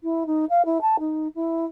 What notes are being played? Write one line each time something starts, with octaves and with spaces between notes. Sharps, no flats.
E4
D#4
F5
E4
A5
D#4
E4